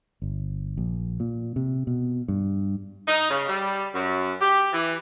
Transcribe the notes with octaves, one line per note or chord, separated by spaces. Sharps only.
G1
A#1
A#2
C3
B2
G2
D#4
C#3
G3
F#2
G4
E3